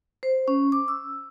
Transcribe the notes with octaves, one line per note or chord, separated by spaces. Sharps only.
C5
C#4
D6
E6